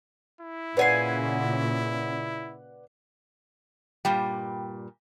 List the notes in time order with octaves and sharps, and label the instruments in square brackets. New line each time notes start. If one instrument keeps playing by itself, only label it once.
[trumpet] E4
[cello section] A#2 C#3 [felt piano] B4 D5 F#5 [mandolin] F5 G#5 C6
[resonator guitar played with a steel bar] G2 A#2 G3 [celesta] G5